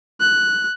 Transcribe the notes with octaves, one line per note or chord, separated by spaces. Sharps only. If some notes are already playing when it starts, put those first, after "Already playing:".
F#6